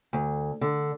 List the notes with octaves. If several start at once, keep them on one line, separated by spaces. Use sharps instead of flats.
D2
D3